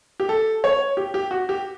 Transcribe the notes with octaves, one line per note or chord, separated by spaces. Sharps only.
G4
A4
C#5
G4
G4
F#4
G4